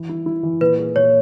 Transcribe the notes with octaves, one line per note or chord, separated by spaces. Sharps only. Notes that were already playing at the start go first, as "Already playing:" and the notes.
Already playing: E3
E4
E4
E3
A#2 B4
G#4
A#2 C#5